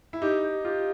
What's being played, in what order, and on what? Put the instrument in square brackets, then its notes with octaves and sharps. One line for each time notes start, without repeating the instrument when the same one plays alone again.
[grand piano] E4
[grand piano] D#4 [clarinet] G4
[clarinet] G4
[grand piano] F4 [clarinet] G4